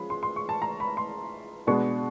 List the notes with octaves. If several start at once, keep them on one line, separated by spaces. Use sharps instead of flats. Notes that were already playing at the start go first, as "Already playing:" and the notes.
Already playing: F3 G#3 C#4 B5
C6
C6
C#6
A5
A#5
B5
C6
B2 G#3 B3 D4 C#6